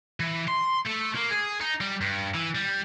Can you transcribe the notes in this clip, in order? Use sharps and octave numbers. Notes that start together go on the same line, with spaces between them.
E3
C6
A3
A#3
G#4
D#4
G3
G2
E3
G3